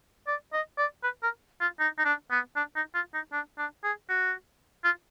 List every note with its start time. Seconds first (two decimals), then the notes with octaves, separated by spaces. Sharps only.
0.27 D5
0.53 D#5
0.78 D5
1.03 B4
1.23 A#4
1.61 F4
1.80 D#4
1.98 D#4
2.05 D4
2.31 B3
2.56 D4
2.76 D#4
2.94 F4
3.14 D#4
3.32 D4
3.58 D4
3.84 G#4
4.09 F#4
4.84 F4